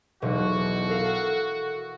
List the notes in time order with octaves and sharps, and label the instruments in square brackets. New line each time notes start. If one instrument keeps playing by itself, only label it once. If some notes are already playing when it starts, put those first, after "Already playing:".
[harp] E1 B1 [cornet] F#4
[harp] A4 A#4 F5